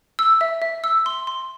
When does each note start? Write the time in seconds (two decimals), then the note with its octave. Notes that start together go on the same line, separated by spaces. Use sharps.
0.19 E6
0.41 E5
0.62 E5
0.84 E6
1.06 C6
1.27 C6